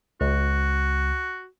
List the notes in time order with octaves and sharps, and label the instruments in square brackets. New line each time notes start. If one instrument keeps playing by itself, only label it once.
[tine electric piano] C#2 [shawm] F#4